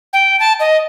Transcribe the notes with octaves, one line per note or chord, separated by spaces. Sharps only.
G5
A5
D#5